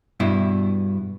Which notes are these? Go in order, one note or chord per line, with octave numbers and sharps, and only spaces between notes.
G2 B2 E4